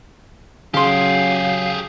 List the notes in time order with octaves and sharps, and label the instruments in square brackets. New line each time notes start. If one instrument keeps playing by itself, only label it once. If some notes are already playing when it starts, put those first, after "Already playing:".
[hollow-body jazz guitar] C#3 C6 [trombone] F#3 [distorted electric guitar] G4 G#4 [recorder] F5